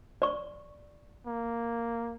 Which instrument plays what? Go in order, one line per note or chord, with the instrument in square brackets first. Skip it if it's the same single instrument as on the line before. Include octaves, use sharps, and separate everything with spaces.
[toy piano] D5 C#6
[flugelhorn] A#3